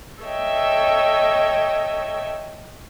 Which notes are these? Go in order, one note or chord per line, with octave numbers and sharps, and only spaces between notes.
A4 C#5 D#5 E5 G5